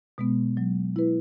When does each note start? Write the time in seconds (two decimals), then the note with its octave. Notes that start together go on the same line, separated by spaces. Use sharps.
0.18 B2 G#3 B3
0.57 F#3
0.96 E4 B4